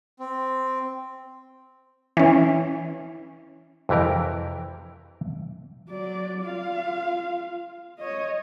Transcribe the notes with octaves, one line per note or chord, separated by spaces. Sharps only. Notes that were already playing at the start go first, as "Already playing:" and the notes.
C4
E3 C#4
F2 C3 E3 G4 A#4
F#3 D5
F4 F5
C#5 D#5